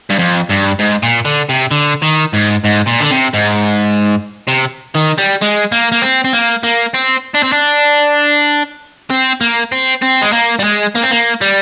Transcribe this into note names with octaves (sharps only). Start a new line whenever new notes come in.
G2
F2
G2
G#2
A#2
D3
C3
D3
D#3
G#2
G#2
A#2
D3
C3
G#2
C3
D#3
G3
G#3
A#3
A#3
C4
C4
A#3
A#3
C4
D4
C4
D4
C4
A#3
C4
C4
G#3
A#3
G3
G#3
A#3
C4
A#3
G3